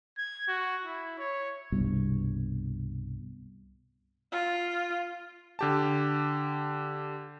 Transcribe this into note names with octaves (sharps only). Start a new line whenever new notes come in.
G#6
F#4
E4
C#5
C2 G2 B2
F4
D3 G4 A5